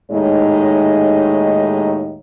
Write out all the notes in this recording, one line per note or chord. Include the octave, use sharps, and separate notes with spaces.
D#2 A2 G#3 D#4 C#5